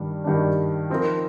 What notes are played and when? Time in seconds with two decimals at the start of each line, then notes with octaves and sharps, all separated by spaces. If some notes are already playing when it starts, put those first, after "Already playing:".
Already playing: G2 D#3 G3 D4
0.24 G2 D#3 G3 D4
0.90 F3 C4 D#4 A#4